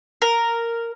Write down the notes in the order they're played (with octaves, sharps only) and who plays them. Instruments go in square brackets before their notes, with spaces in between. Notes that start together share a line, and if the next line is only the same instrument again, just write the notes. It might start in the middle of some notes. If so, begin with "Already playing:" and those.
[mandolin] A#4